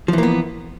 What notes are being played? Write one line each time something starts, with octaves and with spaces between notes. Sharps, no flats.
E3 F3 A#3 B3